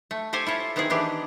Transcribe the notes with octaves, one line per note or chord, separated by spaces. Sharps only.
A3
G4 A4 C5 G#5
E4 F4 C#5
D#3 B3 C4 E4 G#4
D#3 E3 D4 G4